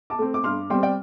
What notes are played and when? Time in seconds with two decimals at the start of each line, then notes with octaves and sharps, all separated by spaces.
0.10 A5 D6
0.19 A3 C4
0.34 D6
0.44 G2 C6 F6
0.70 G3 C4 G5 C6
0.83 D5 G5